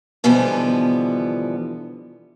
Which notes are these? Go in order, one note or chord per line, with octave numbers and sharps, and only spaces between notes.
B2 D3 E3 F3 G3 B3